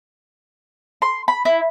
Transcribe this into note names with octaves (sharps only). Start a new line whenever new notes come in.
C6
B5
E4